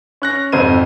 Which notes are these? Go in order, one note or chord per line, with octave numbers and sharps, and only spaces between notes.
C#4 F#6 A#6
G#1 F2 C3 C5 G#6 D#7